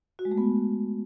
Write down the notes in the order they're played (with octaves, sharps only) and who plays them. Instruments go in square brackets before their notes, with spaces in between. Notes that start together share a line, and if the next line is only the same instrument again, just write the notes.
[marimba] F#4
G#3
A3
B3